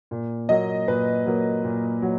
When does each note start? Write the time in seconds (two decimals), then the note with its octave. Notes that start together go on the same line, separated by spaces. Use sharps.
0.11 A#2
0.49 F#3 A#3 D#5
0.88 A#2 B4
1.26 F#3 A#3
1.64 A#2
2.02 F#3